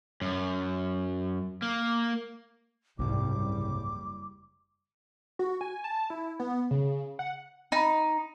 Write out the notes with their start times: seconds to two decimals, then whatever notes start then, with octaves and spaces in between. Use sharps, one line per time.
0.21 F#2
1.62 A#3
2.99 F#1 C2 G#2 F3 G3 D6
5.39 F#4
5.61 G#5
5.84 A5
6.10 E4
6.40 B3
6.71 C#3
7.19 F#5
7.72 D#4